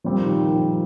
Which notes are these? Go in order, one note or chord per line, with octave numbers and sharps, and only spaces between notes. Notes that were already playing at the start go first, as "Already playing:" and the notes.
A#2 F3 G3 C4
D#3
D#3
F3